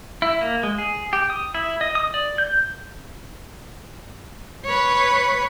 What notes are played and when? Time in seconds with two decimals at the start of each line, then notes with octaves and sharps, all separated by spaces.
0.22 E4
0.41 A#3
0.63 G#3
0.78 G#4
1.13 G4
1.30 D#6
1.55 E4
1.81 D#5
1.95 D#6
2.14 D5
2.38 G6
4.66 B4 C#5